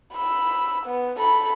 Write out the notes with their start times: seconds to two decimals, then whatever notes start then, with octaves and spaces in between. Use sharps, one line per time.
0.13 B5 E6
0.86 B3
1.19 A4 B5